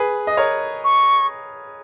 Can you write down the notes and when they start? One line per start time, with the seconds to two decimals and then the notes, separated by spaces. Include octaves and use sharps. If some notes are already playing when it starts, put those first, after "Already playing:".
Already playing: G#4 B4
0.27 D#5
0.37 A#4 C#5
0.84 C#6